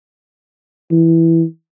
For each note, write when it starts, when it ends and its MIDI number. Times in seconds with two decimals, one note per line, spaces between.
0.91 1.43 52